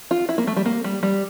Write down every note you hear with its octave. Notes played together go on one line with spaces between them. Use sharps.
F4
E4
A#3
A3
G3
A#3
G3
G3